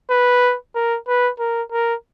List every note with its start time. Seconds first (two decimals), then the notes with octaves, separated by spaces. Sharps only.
0.10 B4
0.75 A#4
1.08 B4
1.40 A#4
1.72 A#4